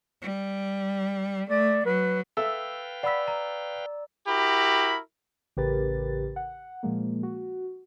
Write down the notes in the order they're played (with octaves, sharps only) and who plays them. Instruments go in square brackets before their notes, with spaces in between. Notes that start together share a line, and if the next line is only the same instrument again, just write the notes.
[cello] G3
[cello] A3 [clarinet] D5
[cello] F#3 [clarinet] B4
[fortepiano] A4 E5 [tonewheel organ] B4 F5 G5 [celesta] E6
[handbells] D5 E6 [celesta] F#5 B5 B6
[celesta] A#5
[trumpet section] E4 F#4 G4 A#4 B5
[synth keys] A1 C#3 G4 A#4 B4 A6
F#5
A#2 F3 G#3 A#3
F#4